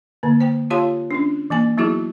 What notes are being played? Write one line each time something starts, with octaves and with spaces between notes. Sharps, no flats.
D3 A#3
C5 G5
F4 G4 C#5 F5 A5 C6
C#4 D4
E3 A#3 G#5
F#3 B3 D#4 E4 F#4 G#4